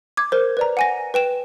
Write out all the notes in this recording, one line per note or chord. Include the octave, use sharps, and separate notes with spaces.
D6 G#6
A#4 C5
B4 D5 A#5
F#5 G#5 A#6
B4 G5 E7